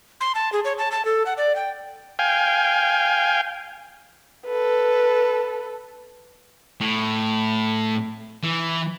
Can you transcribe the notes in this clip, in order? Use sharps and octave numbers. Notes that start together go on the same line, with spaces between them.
C6
A5
G#4
C#5
A5
A5
A4
F#5
D5
G5
F5 G5 G#5
A4 B4
A2
E3